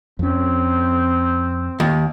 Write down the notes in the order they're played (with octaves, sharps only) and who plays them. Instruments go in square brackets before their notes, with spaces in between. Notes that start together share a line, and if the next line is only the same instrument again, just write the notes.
[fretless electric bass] F2 C#4 [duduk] C4
[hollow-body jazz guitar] D#2